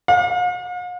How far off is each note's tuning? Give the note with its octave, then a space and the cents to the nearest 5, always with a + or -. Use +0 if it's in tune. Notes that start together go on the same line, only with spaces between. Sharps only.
F5 +45